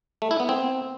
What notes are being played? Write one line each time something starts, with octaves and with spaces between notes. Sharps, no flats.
A3
E4
B3
C4